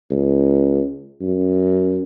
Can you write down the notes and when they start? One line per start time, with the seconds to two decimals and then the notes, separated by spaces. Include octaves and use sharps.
0.11 C#2
1.21 F#2